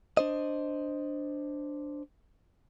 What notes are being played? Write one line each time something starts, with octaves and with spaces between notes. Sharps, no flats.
D4 C5 D#5